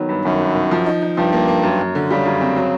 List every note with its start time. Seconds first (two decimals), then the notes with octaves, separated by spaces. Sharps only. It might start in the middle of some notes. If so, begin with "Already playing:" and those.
Already playing: D#3 F#3 B3
0.09 G2
0.25 F#2 D#3
0.41 G2
0.55 D#3
0.71 F3
0.86 D#4
1.02 D#4
1.17 G2 F3
1.33 A#3
1.48 A#3
1.63 F#2
1.78 F#2
1.95 D3
2.10 C#3 G3
2.25 F#2
2.41 C4
2.56 F#3